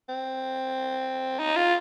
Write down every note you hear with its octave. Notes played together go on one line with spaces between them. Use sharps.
C4
D#4
F4